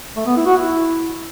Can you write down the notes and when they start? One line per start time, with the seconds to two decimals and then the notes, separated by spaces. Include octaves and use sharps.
0.16 A3
0.26 B3
0.36 E4
0.46 F#4
0.56 E4